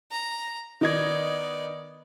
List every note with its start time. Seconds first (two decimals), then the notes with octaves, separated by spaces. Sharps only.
0.11 A#5
0.81 D#3 B3 D#4 D5 G#6